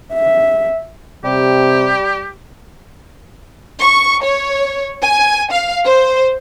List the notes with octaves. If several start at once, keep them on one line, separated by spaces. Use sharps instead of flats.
E5
C3 G3 G4
C#6
C#5
G#5
F5
C5